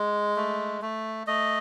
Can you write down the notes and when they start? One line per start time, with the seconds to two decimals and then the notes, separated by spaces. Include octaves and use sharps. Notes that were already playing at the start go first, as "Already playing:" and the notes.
Already playing: G#3
0.36 A3
0.82 A3
1.27 A3 D#5